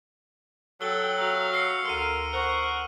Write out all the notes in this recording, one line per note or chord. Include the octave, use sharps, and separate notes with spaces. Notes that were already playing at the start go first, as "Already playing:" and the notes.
F#3 A4 G5 E6 G7
F#4 F5 A#5
F6 C7 C#7
D2 A4 A#4 C6 F6 D#7
A#4 C5 F#5 C#6